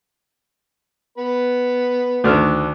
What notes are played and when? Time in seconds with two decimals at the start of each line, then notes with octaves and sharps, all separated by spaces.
1.18 B3 B4
2.24 D2 D#3 A3 D4 F6